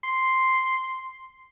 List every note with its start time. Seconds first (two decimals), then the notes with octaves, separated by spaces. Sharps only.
0.03 C6